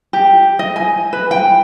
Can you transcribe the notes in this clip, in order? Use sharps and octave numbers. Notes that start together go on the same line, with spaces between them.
G4
D#5
G#5
B4
G5